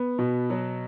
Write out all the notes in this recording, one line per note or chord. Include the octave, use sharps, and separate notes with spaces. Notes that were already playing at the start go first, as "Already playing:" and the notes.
Already playing: B3
B2
F#3